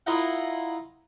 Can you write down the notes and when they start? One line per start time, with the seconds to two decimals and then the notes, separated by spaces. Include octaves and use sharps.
0.06 E4 F4 A#4 D#5 F5 F#5